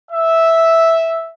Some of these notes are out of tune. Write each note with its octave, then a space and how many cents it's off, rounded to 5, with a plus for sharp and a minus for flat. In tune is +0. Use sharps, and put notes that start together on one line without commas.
E5 -5